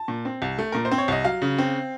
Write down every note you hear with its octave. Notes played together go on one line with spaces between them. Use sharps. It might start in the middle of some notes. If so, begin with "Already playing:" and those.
Already playing: A5
A#2
C4
C2
A3
A#2 A#4
C5
C4
C#5
C2 D#5
F#3 F5
C#3
C4